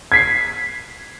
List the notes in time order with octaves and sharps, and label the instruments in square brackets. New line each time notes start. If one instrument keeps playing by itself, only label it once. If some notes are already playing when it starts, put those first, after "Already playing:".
[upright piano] G#6 B6 C7